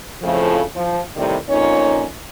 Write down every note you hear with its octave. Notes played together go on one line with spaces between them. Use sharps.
F2 A2 C#3 F3 A3
F3
A2 C3 D#3 G3
F2 A#2 C#4 D#4 C#5